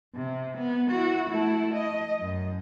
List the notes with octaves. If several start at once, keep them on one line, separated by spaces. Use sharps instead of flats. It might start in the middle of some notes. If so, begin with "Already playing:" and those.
C3
B3
E4 F#4
A3 E4
D#5
F#2